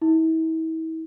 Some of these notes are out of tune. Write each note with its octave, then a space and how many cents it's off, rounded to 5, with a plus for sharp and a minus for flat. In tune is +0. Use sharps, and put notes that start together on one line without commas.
E4 -40